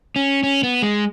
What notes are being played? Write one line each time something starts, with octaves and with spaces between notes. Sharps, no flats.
C#4
C#4
B3
G#3